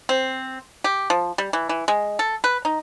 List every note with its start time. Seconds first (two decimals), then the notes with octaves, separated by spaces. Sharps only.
0.09 C4
0.84 G4
1.10 F3
1.38 G3
1.53 E3
1.69 E3
1.88 G#3
2.19 A4
2.44 B4
2.65 D#4